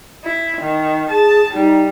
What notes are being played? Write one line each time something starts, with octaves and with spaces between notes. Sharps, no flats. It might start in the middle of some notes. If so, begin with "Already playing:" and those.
E4
D#3
G#4 A5
G3 D#4